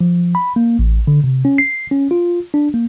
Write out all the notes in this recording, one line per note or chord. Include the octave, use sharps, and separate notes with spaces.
F3
B5
A#3
A1
D3
C3
C#4
C7
C#4
F4
D4
A#3